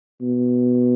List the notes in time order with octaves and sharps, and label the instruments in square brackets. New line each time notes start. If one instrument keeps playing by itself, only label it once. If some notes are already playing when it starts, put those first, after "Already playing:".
[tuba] B2